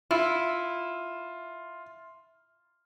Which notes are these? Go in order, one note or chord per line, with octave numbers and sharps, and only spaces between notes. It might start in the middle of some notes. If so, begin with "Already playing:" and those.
E4 F4